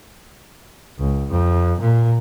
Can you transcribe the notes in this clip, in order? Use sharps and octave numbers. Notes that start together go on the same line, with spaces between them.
C#2
F2
A#2